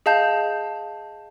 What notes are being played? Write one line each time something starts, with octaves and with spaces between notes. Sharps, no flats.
G#4 D#5 F5 A5 G6